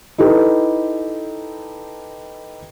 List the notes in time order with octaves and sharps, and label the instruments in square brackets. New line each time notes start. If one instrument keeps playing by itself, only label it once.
[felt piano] D#4 E4 G4 A4 B4